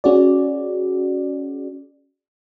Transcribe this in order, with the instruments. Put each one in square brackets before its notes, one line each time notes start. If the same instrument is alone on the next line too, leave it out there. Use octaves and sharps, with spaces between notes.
[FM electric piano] C#4 F#4 G#4 D5